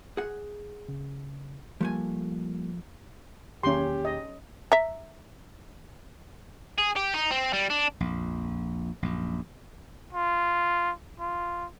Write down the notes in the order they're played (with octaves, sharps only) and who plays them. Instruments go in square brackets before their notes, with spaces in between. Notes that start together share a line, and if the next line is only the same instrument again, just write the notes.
[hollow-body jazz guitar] G#4 F#5
[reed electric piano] C#3
[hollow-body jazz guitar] F3 A3 G#5 [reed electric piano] G3 A#3
[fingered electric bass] E1 D#3 A#3 [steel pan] C#4 C6 [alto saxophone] G4
[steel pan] D#5
[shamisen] E5 A#5
[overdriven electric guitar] G#4
G4
D#4
C4
G3
D4
[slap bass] A#1 F2
A#1 F#2
[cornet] F4
F4